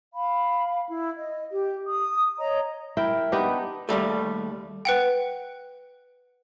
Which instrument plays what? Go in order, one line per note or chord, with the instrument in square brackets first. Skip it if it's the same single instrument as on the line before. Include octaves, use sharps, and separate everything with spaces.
[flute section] F5 B5
E4
D#5
G4
D#6
C#5 D#5 A#5
[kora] E4 A#4 G5
B3 D4 D#4 G4
[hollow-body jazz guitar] D#2 G#2 G3 A3
[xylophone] B4 F#5 G5